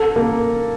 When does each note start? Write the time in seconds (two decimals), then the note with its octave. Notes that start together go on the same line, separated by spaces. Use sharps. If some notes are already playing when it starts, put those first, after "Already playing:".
Already playing: A4
0.16 A#3